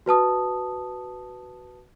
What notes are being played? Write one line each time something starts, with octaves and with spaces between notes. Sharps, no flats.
F#4 B4 A5 D#6